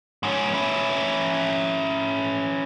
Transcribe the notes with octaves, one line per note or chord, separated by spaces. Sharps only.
G#2 C#4
C#4 E4